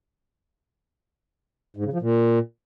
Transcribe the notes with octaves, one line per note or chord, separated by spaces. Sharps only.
G#2
C#3
F3
A#2